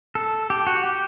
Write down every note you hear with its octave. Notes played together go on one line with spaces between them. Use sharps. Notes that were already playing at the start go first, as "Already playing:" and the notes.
A4
G4
F#4
G4